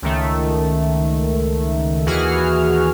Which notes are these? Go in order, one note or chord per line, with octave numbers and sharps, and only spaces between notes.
C#2 D#3 A3
D#2 E3 F#4 G#4 F6